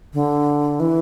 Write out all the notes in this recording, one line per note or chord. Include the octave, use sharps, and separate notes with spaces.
D3
E3